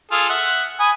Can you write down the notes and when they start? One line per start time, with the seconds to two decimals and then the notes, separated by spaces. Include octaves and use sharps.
0.11 F4 G#4 A4
0.30 E5 F#5
0.80 G#5 B5 D#6